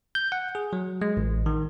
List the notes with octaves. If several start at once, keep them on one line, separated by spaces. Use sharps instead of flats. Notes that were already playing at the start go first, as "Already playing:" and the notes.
G6
F#5
G#4
F#3
G#3
A1
D#3